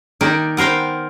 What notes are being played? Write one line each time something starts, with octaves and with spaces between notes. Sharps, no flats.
D#3 A#3 D#4 D5
B3 A#4 C5 F5 G5